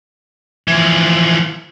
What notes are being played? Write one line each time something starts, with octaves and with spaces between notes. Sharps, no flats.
E3 F3